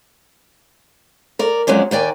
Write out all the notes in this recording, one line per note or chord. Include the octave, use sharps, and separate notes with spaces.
A#4 D5
F2 F#3 G#3 C#4 D5
D#2 A#3 D5 G5 G#5